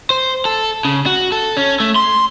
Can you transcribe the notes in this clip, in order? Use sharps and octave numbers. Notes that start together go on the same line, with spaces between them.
C5
A4
C#3
F#4
A4
C#4
A3
C6